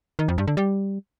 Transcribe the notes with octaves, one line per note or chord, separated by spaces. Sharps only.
D#3
F2
G2
D3
G3